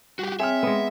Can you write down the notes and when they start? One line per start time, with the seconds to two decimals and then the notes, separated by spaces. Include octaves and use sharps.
0.19 G3 F#4 G4
0.40 C4 G#4 C#5 E5 G5 F6
0.63 G#3 B3